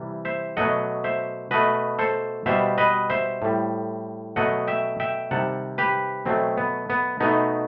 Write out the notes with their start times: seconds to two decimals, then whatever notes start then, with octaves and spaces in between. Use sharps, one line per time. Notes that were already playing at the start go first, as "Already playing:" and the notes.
Already playing: C3 E3 G3
0.25 C5 E5
0.57 B2 F#3 A3 D#5 F#5
1.04 C5 E5
1.51 B2 A3 B4 D#5
1.99 A4 C5
2.46 B2 G3 C5 E5
2.78 B4 D#5
3.10 C5 E5
3.42 A2 G3
4.36 B2 F#3 A3 D#5 F#5
4.67 E5 G5
5.00 E5 G5
5.31 C3 D#3 G3 F#5 A5
5.78 G4 B4
6.25 B2 F#3 A3 C4
6.57 B3
6.90 B3
7.20 B2 A3 B3 D#4